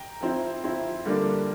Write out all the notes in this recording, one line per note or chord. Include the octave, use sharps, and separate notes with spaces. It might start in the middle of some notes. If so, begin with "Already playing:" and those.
Already playing: G5 A#5
F3 C4 E4
F3 C4 E4
D3 G3 A#3 D4